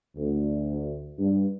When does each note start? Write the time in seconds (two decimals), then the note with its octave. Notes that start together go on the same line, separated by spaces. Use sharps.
0.16 D2
1.19 G2